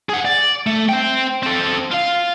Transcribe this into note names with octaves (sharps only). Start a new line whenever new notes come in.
G#4 F#5
D5
A3
C5 G5
C4 A4
F4 F5